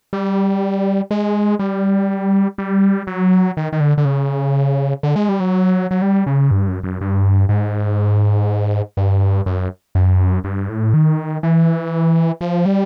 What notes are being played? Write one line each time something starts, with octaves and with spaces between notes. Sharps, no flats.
G3
G#3
G3
G3
F#3
D#3
D#3
D3
D3
C#3
D3
G#3
G3
F#3
F#3
G3
C#3
G2
F#2
F#2
G2
G#2
G2
F#2
F#2
G2
A2
D#3
E3
F3
G3